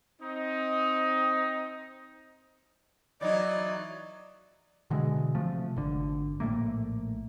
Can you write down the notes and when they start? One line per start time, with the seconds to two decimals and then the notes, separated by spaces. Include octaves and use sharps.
0.20 C4 D#4
3.21 E3 F#3 D#4 D5 D#5
4.90 B2 D3 E3 G#3
5.35 C3 F3 A3
5.76 G#1 D3
6.40 A#1 A2 A3 A#3